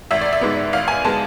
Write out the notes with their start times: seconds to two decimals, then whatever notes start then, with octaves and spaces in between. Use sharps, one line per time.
0.11 G#1 E5
0.21 D5
0.33 E5
0.41 G#2 G#3 B3
0.73 G#1 F5
0.88 G#5
1.05 G#3 B3 A5